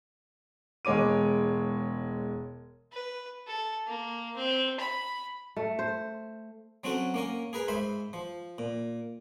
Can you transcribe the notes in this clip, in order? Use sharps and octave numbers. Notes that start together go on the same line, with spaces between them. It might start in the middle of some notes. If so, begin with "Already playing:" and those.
E1 G#3 C#5 D6 D#7
B4
A4
A#3
C4
B5
A3
C5
F#3 C4 C#4 F#4 A4
A#3 C#4 A#4
G#4 A#4 B4 A#5
G#2 C5 E5 B5
F3
A#2